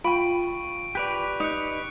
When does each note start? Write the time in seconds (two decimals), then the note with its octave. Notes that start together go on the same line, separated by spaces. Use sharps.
0.04 F4 G5 B5 C#6 D7
0.95 G4 B4 D5 F#6 F7
1.40 D#4 F#6 C#7 F7